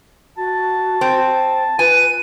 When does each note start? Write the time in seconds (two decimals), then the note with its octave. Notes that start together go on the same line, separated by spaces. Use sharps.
0.38 F#4 A5
1.01 C4
1.79 F4 B4 G#5 D#7